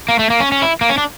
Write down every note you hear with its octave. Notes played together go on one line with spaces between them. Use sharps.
A#3
A3
A#3
C#4
C#4
E4
A#3
C#4
D4